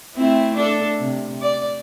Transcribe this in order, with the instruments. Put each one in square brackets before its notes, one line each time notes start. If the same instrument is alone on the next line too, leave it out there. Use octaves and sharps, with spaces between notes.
[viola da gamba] A3 C4 E4
D4 A4
C3
D5